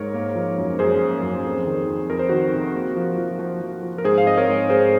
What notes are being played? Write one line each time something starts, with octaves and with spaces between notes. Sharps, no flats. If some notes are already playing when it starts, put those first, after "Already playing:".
Already playing: G#2 A#4 C#5
A#3
F3
F#2
F#2 G#4 C5
A#3
F#2
F2
D#3
F2
F2 A#4
C5
D#3 F#4 A#4
C3
A#3
F3
F3
F3
F3
F3
A#4
G#2 G#4 C5
F5
C4 D#5
A#4 C#5
G#2
G#2 G#4 C5